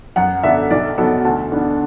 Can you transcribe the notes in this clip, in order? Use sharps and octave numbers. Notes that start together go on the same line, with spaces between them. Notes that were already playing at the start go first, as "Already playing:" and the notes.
F#2 F#5
D3 B3 D4 E5
B1 D5
B2 F#3 B3 A4
D2 A5
D3 B3 D4